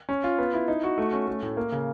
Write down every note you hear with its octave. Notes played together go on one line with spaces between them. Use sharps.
C#4
F4
B3
E4
D#4
F#4
A3
C#4
A3
A2
A#3
C#3